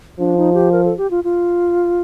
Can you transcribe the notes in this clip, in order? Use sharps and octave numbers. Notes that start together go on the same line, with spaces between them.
F3 D4
D#4
G4
A#4
A4
G4
F4
F4